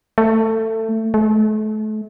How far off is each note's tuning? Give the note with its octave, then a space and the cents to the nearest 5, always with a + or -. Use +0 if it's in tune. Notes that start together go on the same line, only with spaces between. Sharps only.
A3 +20
A3 -35